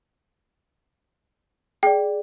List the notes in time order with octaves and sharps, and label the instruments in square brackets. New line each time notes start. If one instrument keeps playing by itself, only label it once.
[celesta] G#4 D5 [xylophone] G5